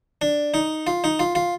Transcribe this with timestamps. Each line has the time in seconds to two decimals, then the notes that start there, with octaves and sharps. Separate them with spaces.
0.22 D4
0.54 D#4
0.87 F4
1.04 D#4
1.19 F4
1.35 F4